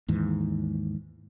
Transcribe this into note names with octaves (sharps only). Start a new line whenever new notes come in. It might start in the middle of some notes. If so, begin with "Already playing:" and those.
D#2 G#2 E3